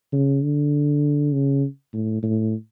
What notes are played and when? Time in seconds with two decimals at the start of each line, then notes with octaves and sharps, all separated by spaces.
0.13 C#3
0.44 D3
1.33 C#3
1.93 A2
2.23 A2